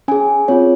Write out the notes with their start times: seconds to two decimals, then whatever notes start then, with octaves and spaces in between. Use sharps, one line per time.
0.08 C#4 G#4 G#5
0.48 C4 F4 G#4 C#5